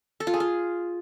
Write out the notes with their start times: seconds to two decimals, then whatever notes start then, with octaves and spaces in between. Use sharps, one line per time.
0.20 A4
0.27 F4
0.34 G#4
0.40 F4